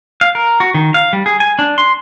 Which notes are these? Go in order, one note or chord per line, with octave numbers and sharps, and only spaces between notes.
F5
A#4
F#4
D#3
F5
G3
G#4
G#5
D4
C6